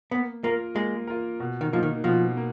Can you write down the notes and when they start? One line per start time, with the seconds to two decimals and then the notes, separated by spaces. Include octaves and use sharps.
0.11 A#3 B3
0.44 A#3 F4 A#4
0.76 G#3 A#3
1.07 F4 A#4
1.40 B2
1.61 D#3
1.73 F3 A#3 D#4
1.83 D#3
2.04 B2 F3
2.37 A#3